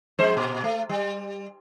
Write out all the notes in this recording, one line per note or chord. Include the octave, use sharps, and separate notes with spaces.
F2 G#3 C5
A#2
A3
G3